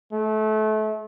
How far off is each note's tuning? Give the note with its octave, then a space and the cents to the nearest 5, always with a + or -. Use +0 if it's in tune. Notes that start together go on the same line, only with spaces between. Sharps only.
A3 -30